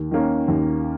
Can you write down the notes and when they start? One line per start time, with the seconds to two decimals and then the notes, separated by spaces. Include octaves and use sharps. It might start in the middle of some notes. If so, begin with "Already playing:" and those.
Already playing: D#2
0.11 D#3 A#3 C#4
0.48 D#2